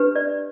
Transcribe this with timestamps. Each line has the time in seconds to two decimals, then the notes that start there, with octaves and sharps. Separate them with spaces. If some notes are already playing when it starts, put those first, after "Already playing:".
Already playing: D4 G4 B4
0.15 D5